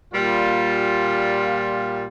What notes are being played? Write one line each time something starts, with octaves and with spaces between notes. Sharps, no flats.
A#2 G3 F4